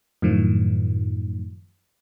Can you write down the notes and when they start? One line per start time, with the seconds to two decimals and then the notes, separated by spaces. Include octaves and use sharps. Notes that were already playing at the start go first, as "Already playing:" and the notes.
0.22 F#2 A2 D#3 F3